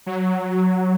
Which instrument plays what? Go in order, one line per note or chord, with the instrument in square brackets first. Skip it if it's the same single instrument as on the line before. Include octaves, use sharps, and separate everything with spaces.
[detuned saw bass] F#3